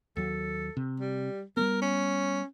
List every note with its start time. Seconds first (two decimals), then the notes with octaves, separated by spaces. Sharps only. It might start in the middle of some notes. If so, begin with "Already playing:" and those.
0.17 D#2 F#3 A4
0.77 C3
1.00 G3
1.57 G3 G#3 B3 A#4
1.82 C#4